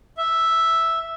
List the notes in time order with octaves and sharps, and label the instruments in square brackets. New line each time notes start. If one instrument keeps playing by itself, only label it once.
[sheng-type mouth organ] E5